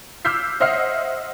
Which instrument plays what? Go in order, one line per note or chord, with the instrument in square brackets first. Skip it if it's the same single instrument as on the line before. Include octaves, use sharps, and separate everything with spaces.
[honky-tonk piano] D6 E6 F6 G6 B6 C7
C5 D#5 E5 F#5 F6 C7